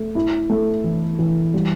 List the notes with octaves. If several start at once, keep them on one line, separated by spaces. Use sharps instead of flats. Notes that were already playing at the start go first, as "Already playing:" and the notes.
Already playing: A3
E4
A3
E3
E3
G3